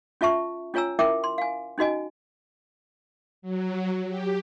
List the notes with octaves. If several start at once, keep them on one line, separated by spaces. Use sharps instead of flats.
C#4 F4 E5 A5 C#6
C#4 F4 C#5 G#5 A#5 E6
C#4 E4 A#4 E5 G5 D6
C6
F5 G#5
C#4 D#4 F#4 D#5 G#5
F#3
G4